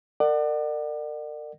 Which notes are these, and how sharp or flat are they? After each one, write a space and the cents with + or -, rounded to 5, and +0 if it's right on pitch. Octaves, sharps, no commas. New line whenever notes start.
A#4 -30 D5 +35 F#5 +15